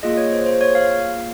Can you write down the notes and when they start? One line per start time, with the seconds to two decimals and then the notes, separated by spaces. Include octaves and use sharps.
0.03 A#3 F4 G#4 D#5
0.17 C#5
0.32 C5
0.46 C5
0.61 C#5
0.75 F5